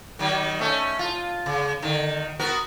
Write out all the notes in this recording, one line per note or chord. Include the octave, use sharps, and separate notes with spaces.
D#3 F#3
A3 C#4
F4
C#3
D3 D#3
B3 F#4 A#4